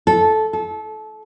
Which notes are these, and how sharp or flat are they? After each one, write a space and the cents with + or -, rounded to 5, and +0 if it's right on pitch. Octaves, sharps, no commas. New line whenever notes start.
A4 -15
A4 -25